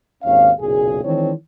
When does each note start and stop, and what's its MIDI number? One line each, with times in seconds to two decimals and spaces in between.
0.24 0.51 32
0.24 0.51 39
0.24 0.51 61
0.24 0.51 77
0.60 1.03 30
0.60 1.03 35
0.60 1.03 46
0.60 1.03 68
1.05 1.32 51
1.05 1.32 52
1.05 1.32 56
1.05 1.32 60
1.05 1.32 62
1.05 1.32 73